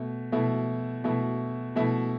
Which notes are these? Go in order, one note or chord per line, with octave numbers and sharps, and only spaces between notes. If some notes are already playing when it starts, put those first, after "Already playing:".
Already playing: B2 A3
B2 A3 E4
B2 A3 E4
B2 A3 E4